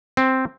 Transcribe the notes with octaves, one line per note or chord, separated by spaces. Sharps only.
C4